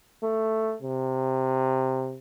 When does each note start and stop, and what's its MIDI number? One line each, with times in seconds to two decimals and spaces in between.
0.23 0.75 57
0.82 2.17 48